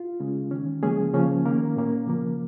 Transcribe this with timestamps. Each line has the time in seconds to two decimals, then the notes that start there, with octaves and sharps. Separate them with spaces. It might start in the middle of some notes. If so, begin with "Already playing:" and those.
Already playing: F4
0.20 C#3 G#3 C#4
0.51 D#3 C#4
0.83 C#3 F3 G#3 A#3 C#4 G#4
1.13 C#3 F3 A#3 C#4
1.45 D#3 A#3 C#4 A#4
1.76 A#2 A#3 C#4
2.07 C#3 F3 A#3